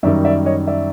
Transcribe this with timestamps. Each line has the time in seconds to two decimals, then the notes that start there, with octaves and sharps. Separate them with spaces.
0.03 F#2 D#3 G3 D5 E5
0.25 D5 E5
0.46 C#5 D#5
0.67 D5 E5